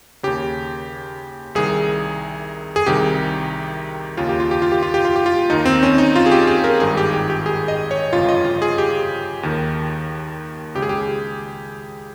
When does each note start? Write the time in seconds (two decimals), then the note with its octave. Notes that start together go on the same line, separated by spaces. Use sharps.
0.23 D#2 C#3 G4
1.55 C2 C3 D#3 G#4
2.76 G#4
2.86 C2 C3 D#3 G4
4.17 D#2 C#3 F4
4.29 G4
4.40 F4
4.51 G4
4.62 F4
4.72 G4
4.82 F4
4.94 G4
5.05 F4
5.16 G4
5.26 F4
5.50 D#2 D#3 D#4
5.66 C4
5.83 C#4
5.98 D#4
6.16 F4
6.26 G#4
6.31 G4
6.47 G#4
6.64 A#4
6.80 G#1 G2 D#3 G#4
6.97 G4
7.13 G4
7.30 G4
7.46 G#4
7.68 D#5
7.91 C#5
8.12 G1 F2 C#3 F4
8.29 D#5
8.45 F4
8.62 G#4
8.78 G4
9.43 D#2 D#3
10.75 C#2 C#3 G4
10.82 G#4
10.89 G4